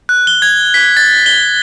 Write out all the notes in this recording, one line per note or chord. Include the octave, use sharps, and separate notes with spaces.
F#6
G7
G#6
B6
A6
G7